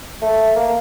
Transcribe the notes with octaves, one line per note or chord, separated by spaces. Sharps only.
A3
A#3